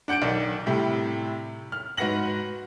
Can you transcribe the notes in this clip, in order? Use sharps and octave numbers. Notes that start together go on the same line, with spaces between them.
D4 F#5 G6 C#7 D7
B1 D#3 D5
A2 C3 G3
F6
G#2 F#4 B4 F#5 A#6 F#7